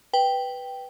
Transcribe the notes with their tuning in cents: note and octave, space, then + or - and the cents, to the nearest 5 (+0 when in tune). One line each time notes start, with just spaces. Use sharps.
B4 +0 G5 +0